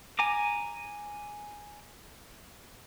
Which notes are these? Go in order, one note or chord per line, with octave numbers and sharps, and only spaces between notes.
G#5 A#5 D6